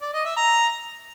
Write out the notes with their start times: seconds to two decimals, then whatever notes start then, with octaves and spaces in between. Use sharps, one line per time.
0.02 D5
0.13 D#5
0.25 E5
0.37 A#5